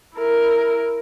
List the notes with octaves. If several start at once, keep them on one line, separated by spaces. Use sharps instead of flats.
E4 A#4